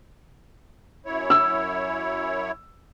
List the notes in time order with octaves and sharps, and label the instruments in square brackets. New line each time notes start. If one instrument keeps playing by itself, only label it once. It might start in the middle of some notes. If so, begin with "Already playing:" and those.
[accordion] F#2 E4 C#5
[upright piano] E6